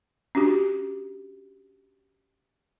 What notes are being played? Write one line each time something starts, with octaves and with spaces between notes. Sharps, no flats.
C#4 D4 F#4 G4